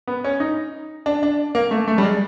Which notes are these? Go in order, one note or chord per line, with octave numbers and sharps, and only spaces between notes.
B3
C#4
D#4
D4
D4
A#3
A3
A3
G3
G#3